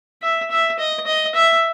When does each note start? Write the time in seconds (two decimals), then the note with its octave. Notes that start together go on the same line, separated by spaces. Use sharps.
0.22 E5
0.51 E5
0.79 D#5
1.06 D#5
1.35 E5